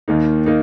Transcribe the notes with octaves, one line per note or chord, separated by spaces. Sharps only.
D#2 D#3 A#3 D#4
A#3 D#4